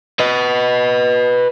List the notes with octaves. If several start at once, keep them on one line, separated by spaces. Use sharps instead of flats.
B4 D#5